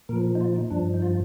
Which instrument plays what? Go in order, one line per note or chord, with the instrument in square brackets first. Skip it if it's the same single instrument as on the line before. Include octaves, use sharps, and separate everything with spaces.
[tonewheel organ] A#2 F3 A#4
D#4
F4
D#4
G2 F3 D4
D#4
F4